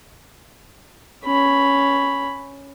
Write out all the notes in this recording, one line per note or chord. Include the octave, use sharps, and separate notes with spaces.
C#4 B5